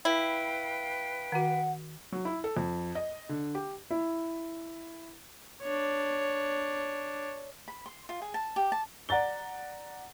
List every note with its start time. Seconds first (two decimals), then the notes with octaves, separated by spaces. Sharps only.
0.05 E4 B4 F5 G5
1.32 D#3 F#4 F#5
2.12 F#3
2.25 E4
2.44 A4
2.57 F2
2.95 D#5
3.29 D3
3.55 G4
3.90 E4
5.62 D4 C#5
7.68 B5
7.86 C6
8.09 F4
8.22 G#4
8.34 A5
8.56 G4
8.72 A5
9.09 D5 F#5 A#5 A6 G7